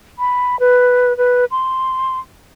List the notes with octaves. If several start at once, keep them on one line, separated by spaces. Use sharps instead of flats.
B5
B4
B4
C6